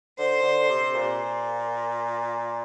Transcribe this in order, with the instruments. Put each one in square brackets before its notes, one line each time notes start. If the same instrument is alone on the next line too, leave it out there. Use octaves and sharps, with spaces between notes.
[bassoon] D3 [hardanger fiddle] C5
[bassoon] D3
C3
A#2